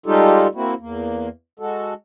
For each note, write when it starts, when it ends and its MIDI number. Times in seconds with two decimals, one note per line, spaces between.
0.06 0.47 55
0.06 0.47 56
0.06 0.47 63
0.06 0.47 65
0.06 0.47 67
0.06 0.47 69
0.55 0.74 58
0.55 0.74 60
0.55 0.74 64
0.55 0.74 66
0.80 1.28 40
0.80 1.28 58
1.59 1.94 56
1.59 1.94 66
1.59 1.94 69